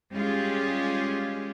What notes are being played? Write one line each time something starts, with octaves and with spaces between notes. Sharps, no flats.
G3 G#3 C#4 F4 G4 G#4